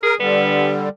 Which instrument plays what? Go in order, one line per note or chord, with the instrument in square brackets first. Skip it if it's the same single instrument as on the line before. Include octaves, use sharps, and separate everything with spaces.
[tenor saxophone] G#4 [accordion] A#4
[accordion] D3 G3 [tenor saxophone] B3